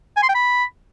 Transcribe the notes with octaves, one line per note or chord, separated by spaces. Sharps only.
G#5
C6
G5
B5